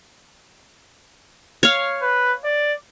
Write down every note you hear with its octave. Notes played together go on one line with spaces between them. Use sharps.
C#5 F5
B4
D5